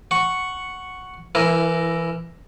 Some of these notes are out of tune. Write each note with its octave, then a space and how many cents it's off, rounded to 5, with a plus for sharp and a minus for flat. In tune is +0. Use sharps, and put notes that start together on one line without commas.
F#5 +0 C#6 +0
E3 +20 E4 +0 A#4 +0